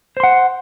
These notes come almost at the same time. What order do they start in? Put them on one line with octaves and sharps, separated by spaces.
C5 C6 F#5